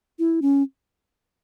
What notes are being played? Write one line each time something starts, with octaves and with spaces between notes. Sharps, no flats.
E4
C#4